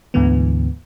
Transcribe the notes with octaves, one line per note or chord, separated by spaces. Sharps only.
D2 G#2 D3 E3 B3